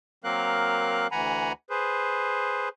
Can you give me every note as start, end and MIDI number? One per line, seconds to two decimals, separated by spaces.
0.24 1.07 54
0.24 1.07 58
0.24 1.07 60
0.24 1.07 70
0.24 1.07 77
0.24 1.07 90
1.12 1.52 38
1.12 1.52 52
1.12 1.52 78
1.12 1.52 80
1.12 1.52 82
1.12 1.52 83
1.70 2.69 68
1.70 2.69 71
1.70 2.69 72